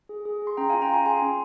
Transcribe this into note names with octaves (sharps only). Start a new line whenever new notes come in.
G#4
G#4
G#4
C6
C#4 G5 A#5
F5 G#5
F4
G5 A#5
F4 G#5 C6
G#4 G#5 C6
C#4